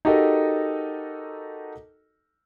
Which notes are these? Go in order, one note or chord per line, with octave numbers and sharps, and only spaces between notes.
D#4 F#4 G4 A4 A#4 D#5